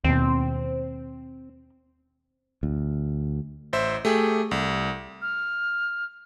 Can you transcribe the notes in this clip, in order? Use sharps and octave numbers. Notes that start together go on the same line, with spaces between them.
D#2 B2 C4
D2
A1 C5 E5
A3 G4 G#4
C2
F6